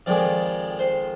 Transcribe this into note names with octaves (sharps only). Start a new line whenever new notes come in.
F2 D#3 G#3 D5
C5